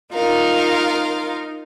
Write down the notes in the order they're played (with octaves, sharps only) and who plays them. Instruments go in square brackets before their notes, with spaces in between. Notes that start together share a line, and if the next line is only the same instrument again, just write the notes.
[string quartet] D#4 F4 A#4 F5